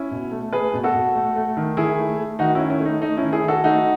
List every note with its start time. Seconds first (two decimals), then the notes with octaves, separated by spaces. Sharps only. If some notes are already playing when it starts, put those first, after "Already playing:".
Already playing: C#4 E4
0.11 B2
0.31 A3
0.52 A3 G#4 B4
0.74 B2
0.84 F#4 A4
0.94 B2
1.15 A3
1.36 A3
1.57 D#3
1.77 D#3 E4 G#4
1.98 A3
2.18 A3
2.39 D#3 D#4 F#4
2.55 C#4 E4
2.60 D#3
2.70 C#4 E4
2.80 A3
2.85 D#4
3.01 A3 D#4
3.17 C#4 E4
3.23 D#3
3.32 E4 G#4
3.43 D#3
3.48 F#4 A4
3.63 A3 D#4 F#4